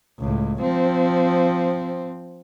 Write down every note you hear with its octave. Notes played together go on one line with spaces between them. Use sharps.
C#2 A2
F3 C4